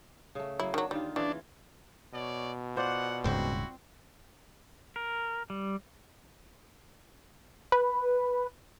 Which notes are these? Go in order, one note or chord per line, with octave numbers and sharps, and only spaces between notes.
C#3 A3
F#3 A#3 E4
D#3 F#3 D4
D3 D#3 G3 F4
C#3 E3 D4 F4
B2 C#5 D5
F4 C5 D5 F#5
D#1 G#2 C#3 C4 E4 F#4 C5
A#4
G3
B4